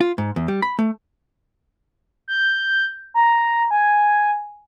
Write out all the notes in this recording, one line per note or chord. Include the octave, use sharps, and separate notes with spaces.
F4
G#2
E2
G3
B5
A3
G6
A#5
G#5